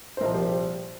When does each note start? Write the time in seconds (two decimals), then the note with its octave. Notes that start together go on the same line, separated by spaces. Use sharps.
0.17 C5
0.21 C2 A#2 F3 A#4 D#5
0.34 G4 C5
0.47 G4 C5